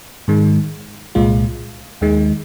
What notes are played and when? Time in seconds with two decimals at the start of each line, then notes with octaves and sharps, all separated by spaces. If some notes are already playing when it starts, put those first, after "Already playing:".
0.28 G#2 D#3 G#3
1.15 C2 A#2 G#3 F4
2.01 D#2 D#3 G#3